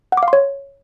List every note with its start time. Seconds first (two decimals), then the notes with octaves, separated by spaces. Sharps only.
0.12 F#5
0.17 D6
0.23 F5
0.28 C6
0.33 C#5